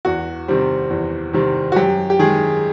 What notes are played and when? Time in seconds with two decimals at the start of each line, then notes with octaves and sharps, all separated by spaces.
0.05 E2 F#4
0.48 C3 D#3 G3 C4
0.90 E2
1.33 C3 D#3 G3 C4
1.72 F#4
1.76 F#2 G4
2.10 G4
2.19 D#3 G#3 G#4